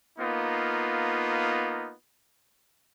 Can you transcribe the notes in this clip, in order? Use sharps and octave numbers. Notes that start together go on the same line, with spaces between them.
A#3 B3 D#4 F4